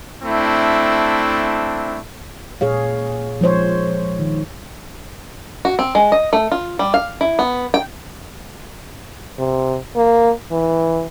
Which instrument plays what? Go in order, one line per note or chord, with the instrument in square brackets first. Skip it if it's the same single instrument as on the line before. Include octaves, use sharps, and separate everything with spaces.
[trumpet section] A3 C4 D4 E4
[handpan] A#2 G#4 C#5 F5
F3 G#3 C5 C#5
D#3
[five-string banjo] F#4
C4
G#3
D#5
A3
F4
G3
F5
E4
B3
G5
[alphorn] C3
A#3
E3